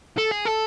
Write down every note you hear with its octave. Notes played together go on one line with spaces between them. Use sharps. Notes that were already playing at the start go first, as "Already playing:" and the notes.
A4
G#4
A4